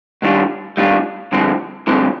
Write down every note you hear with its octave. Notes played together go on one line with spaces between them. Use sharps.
G#2 D#3 G3 D4 F4
G#2 D#3 G3 D4 F4
G2 D3 F3 G#3 C4
G2 D3 F3 G#3 C4